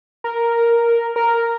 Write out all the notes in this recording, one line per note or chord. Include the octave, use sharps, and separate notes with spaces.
A#4
A#4